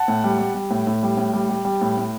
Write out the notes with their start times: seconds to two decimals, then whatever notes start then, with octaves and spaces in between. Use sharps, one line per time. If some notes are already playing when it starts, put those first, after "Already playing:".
Already playing: F#5 A5
0.08 A2
0.24 G3
0.39 G3
0.55 G3
0.71 A2
0.87 A2
1.03 G3
1.17 A2
1.33 G3
1.49 G3
1.65 G3
1.82 A2
1.98 A2